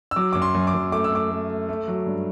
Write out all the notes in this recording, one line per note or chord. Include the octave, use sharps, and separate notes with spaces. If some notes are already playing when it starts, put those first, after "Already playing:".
E6
F#3 D6
F#2 D6
C6
F#2
D6
F#2
A3 D6
E6
A3 D6
A3
A3
A3
F#3
G2